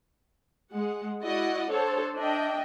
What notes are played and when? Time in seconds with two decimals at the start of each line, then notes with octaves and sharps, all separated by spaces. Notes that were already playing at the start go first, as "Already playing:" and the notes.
0.72 G#3 F#5
1.22 E4 F#4 D5 D#5 F#5
1.71 D4 A4 C5 C#5
2.16 D4 D#5 E5 G5